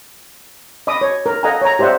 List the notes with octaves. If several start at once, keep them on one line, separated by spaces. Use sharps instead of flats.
D#5 B5 D6 D#6
C#5
A#4
A4 D#5 F5 F#5 G#5 A#5
C#5 A#5
G4 C5 D5 E5 F#5